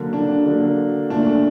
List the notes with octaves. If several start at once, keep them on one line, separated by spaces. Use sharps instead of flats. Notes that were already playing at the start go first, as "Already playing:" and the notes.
Already playing: D3 F#3 A#3
D4
D3 F#3 A#3
A#2 A3 D4